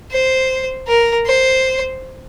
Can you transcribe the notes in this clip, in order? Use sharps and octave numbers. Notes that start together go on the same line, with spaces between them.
C5
A#4
C5